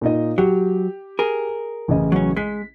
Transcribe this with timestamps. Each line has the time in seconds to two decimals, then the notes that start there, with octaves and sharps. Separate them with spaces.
0.01 A#2 D#4 D#5
0.38 F#3 G4
1.19 G#4 A#4
1.88 A1 C#3 D#5
2.12 F#3 C#4
2.37 G#3 B6